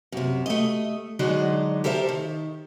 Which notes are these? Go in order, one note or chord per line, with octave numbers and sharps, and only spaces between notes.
F#2 C3
A3 D#5
D3 F#3 G#3 D4 D#4
G4 A4 A#4 C5 E5
D#3